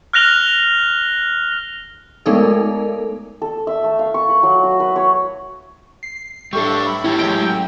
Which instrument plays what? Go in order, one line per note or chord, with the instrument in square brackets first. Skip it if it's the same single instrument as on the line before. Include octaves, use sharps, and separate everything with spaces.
[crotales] F6 F#6 A#6 F7 G7
[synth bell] G#3 A3 B3 D#4 A4 A#4
[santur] A4
E5
A3
F5
C#6
B4
F#3
F#4
B4
C#5
[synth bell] C7
[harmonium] A2 E5 [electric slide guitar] G3 D4 [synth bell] A4 C#6
[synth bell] B5
[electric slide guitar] C#4 G4 [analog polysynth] E4
[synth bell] F#3 G#3 A3 [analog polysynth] G5